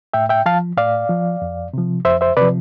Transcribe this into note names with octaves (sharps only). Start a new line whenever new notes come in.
A2 E5 G5
E5 G5
F3 F5 A5
A2 D5 F5
F3
F2
C3 F3
F2 C5 E5
C5 E5
C3 F3 B4 D5